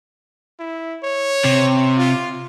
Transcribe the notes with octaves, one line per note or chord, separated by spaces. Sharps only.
E4
C#5
C3
F4